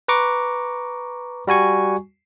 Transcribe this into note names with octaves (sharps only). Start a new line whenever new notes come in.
B4 A#5 C#6 D6
G3 F#4 G#5 C#6